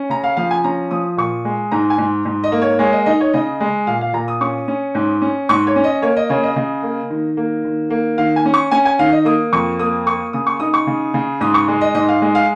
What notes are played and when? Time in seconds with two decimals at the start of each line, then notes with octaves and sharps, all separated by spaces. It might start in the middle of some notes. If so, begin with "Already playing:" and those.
Already playing: C#4
0.10 C#3 A#5
0.24 F5
0.37 F3 F5
0.51 G#5
0.64 C#4 A#5
0.91 F3 D#6
1.17 A#2 C#6
1.45 G#3
1.71 G#2 A#5
1.90 G#5
1.98 G#2
2.25 G#2
2.44 D#5
2.52 A#3
2.62 C#5
2.79 G#3 C#5
2.92 D#5
3.06 D#4 D#5
3.20 C#5
3.33 C#3 D#5
3.60 G#3
3.87 A#2 F5
4.01 F5
4.13 A#2 A#5
4.28 D#6
4.41 C#4 C#6
4.68 C#4
4.95 G#2
5.22 C#4
5.49 G#2 C#6
5.67 C#5
5.76 C#4
5.84 D#5
6.02 A#3 C#5
6.17 D#5
6.30 C#3 C#5
6.43 D#5
6.56 C#3 D#5
6.83 A#3
7.10 D#3
7.37 A#3
7.65 D#3
7.90 A#3
8.18 D#3 F5
8.36 G#5
8.45 C#4
8.54 C#6
8.71 C#4 G#5
8.85 G#5
8.99 D#3 F5
9.12 D#5
9.25 A#3 D#6
9.53 F2 C#6
9.79 A#3 D#6
10.06 A#3 C#6
10.33 C#3 D#6
10.47 C#6
10.60 D#4 D#6
10.74 C#6
10.87 C#3
11.14 C#3
11.41 G#2 D#6
11.54 C#6
11.68 G#3
11.81 D#5
11.95 G#2 D#5
12.09 F5
12.22 G#3 D#5
12.35 F5